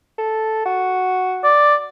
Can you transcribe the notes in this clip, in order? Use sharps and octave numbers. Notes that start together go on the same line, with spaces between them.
A4
F#4
D5